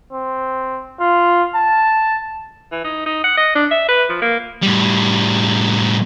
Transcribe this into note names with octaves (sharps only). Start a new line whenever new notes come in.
C4
F4
A5
E3
D#4
D#4
F#5
D#5
D4
E5
B4
F3
A#3
A2 G3